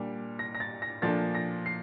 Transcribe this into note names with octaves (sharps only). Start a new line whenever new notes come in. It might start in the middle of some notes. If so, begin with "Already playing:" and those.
Already playing: A#2 G3 D4
A#6
A#6
A6
A#6
A#2 F3 A3 D4 A6
A#6
C7